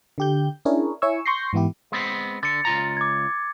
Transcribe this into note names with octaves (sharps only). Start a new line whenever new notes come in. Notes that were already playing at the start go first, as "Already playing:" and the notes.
D3 G4 G6
C#4 D4 E4 G#4 A#4 C#5
E4 C#5 G#5 C#6 E6
C6 C#6 G6 A#6 C7
G#2 E3 B3 E4 G4
G#3 B3 C4
D3 A6 C#7
C#2 F4 A#5
D6 G#6